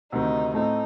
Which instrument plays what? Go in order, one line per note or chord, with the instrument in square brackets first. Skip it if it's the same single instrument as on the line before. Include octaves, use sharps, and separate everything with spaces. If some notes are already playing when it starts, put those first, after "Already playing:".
[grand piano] D2 C3 D#3 [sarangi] D#4
[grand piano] A2 A3 C4 [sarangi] D#4